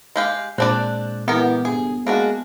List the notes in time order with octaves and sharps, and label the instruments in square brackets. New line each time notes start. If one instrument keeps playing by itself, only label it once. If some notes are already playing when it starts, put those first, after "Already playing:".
[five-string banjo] G#3 G4 F5
[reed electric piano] A#2 G#3 F#6 [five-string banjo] C4 D4 D5
[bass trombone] E3 [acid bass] B3 [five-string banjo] G4 A#4
[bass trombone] G1 [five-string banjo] G#4
[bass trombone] G#3 [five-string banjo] A#3 D4 F#4